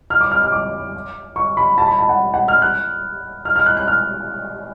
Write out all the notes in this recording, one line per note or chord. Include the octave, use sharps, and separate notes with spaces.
F6
D6
F6
F6
D6
C#6
B5
A5
B5
A5
F#5
F#5
F6
F#6
F6
F6
F#6
F#6
F6